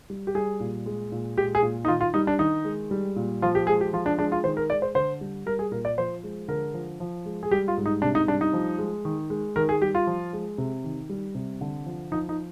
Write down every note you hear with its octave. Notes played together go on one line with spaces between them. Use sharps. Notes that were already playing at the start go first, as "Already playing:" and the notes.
G3
G4
G3 G#4
A#2
G#3
A#2
G#3 G4
G#4
A#2
D#4
D#3 F4
F4
G3 D#4
D4
D#3 D#4
G#3
G3
A#2
F3 F4
G4
G#3 G#4
G4
F3 F4
D4
G#3 D4
F4
D#3 C5
A#4
G#3 D5
C5
D3 C5
G3
G3 A#4
G#4
A#2 A#4
D5
F3 C5
G#3
D3 A#4
F3
F3
G#3
G#4
G3 G4
F4
G#2
D#4
C3 D4
D#4
G3 D4
D#4
F3
G#3
D#3
G#3
D#3 A#4
G#4
G3 G4
F4
F3
G#3
C3
D#3
G3
C3
D3
F3
F3 D#4
D#4